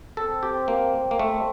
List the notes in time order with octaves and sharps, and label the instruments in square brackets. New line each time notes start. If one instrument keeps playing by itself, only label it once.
[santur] C4 [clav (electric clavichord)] A4
[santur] C4 [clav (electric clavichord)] G4
[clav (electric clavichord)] A#3 [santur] C4
[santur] C4
[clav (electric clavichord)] A#3
[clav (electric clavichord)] A3 [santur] C5